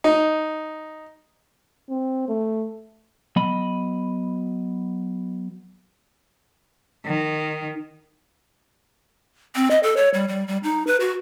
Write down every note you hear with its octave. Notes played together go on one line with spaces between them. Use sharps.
D#4
C4
A3
F#3 B3 D#5 B5
D#3
C4
D#5
A4
C#5
G3
G3
G3
D#4
B4
F#4